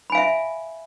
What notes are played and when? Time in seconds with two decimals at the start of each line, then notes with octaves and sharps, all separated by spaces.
0.10 B5
0.12 G#5
0.15 F5
0.17 E5